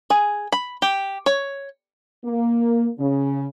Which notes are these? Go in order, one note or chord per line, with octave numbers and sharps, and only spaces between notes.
G#4
B5
G4
C#5
A#3
C#3